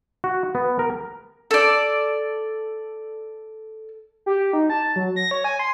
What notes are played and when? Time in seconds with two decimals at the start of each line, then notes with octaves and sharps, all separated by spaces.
0.24 F#4
0.55 B3
0.79 A#4
1.51 A4 D5
4.26 G4
4.53 D#4
4.70 A5
4.96 F#3
5.16 A#6
5.31 C#5
5.44 G#5
5.59 C6